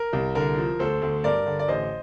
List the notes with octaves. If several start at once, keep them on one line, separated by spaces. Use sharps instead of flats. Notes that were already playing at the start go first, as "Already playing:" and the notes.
Already playing: A#4
C2
D3 A#4
F3
D2 A4 C5
D2
G2 A#4 D5
D3
D5
A1 C5 D#5